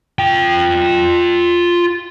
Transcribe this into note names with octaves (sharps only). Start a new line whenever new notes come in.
F4 G5